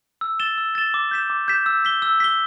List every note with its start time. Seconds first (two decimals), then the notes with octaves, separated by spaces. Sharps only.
0.21 E6
0.40 A6 E7 G7
0.58 E6
0.75 A6 E7 G7
0.94 D6
1.11 G6 B6 E7
1.30 D6
1.48 G6 B6 E7
1.66 E6
1.85 B6 G7
2.02 E6
2.20 B6 G7